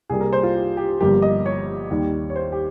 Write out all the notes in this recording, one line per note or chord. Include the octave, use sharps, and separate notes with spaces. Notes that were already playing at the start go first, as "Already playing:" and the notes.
C2 C3 G3 A#3 G#4
A#4
C5
F4
G4
G4
G1 G2 F3 A#3 G4
D#5
C#5
D#2 D#3 G3
C#5
C5
G4